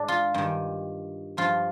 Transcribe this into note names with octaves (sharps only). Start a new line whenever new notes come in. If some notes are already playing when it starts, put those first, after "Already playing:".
Already playing: G#2 D4
F4
G2 D#3
G2 F3 F4